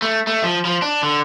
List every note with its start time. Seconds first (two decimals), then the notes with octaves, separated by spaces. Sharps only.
0.02 A3
0.27 A3
0.43 F3
0.65 F3
0.82 D4
1.03 D3